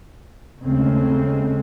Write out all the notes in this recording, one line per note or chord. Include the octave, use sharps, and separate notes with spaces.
D#2 C#3 G#3 A3 C4 C#4